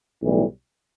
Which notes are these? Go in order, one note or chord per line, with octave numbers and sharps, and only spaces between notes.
B1 A2 E3 G3